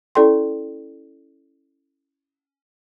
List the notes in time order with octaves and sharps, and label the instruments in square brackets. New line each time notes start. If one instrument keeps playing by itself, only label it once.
[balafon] C#4 E4 A4 D5 G5 C6